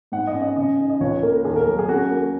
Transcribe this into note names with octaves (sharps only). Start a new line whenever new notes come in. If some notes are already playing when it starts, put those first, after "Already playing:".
G#2 F#5
D#5
C#4
D#5
C#3 D#5
D#4
D#5
C#2 C#5
C#5
A#3 A#4
D#2 G#4
A#4
F#3
G#4
C#4 F#4
A#3